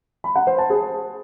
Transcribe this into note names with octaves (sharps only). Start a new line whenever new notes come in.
B5
F#5
C5
A5
G#4